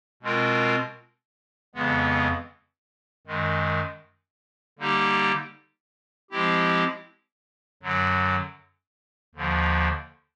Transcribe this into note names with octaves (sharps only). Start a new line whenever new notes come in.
B2 G#3 C4 F4 A#4
F2 C#3 E3 G#3 B3
F#2 D#3 G#3
D3 G3 A#3 D#4 G4
F3 G#3 C4 E4 G4
F#2 D3 F#3
D#2 D3 F3